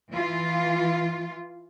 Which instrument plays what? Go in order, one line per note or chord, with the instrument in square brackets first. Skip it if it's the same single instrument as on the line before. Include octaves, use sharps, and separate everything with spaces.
[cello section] E3 F4